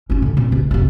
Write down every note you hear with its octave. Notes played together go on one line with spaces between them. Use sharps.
C#4 F4
D3
A#2 C4
C#2
C2 F#2